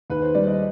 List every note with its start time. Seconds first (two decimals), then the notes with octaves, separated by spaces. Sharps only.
0.10 D#2 B4
0.22 C5
0.35 G3 D5
0.47 D#5